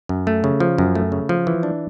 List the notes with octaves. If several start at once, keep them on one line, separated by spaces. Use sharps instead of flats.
F#2
A3
C#3
F3
F#2
A3
C#3
F3
E3
D4